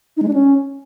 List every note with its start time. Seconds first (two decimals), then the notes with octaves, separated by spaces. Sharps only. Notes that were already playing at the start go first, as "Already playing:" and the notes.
0.17 D#4
0.22 G#3
0.28 D4
0.33 C#4